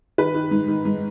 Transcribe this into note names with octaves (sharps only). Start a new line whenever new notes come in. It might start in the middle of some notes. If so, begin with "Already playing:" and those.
D#3 B4
D#3
G#2
D#3
G#2